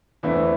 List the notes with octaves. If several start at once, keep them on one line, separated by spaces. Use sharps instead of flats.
E2 D3 E3 A3 C4 E4